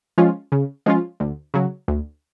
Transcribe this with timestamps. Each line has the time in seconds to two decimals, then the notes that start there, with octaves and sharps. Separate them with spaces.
0.18 F3 G#3 C#4 F4
0.52 C#3
0.86 F3 G#3 C#4 F4
1.20 D2
1.54 C#3 F#3
1.88 D2